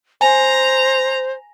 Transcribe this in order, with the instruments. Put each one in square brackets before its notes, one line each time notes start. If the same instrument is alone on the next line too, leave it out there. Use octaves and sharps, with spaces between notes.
[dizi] C5 [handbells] G#5 [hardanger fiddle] A#5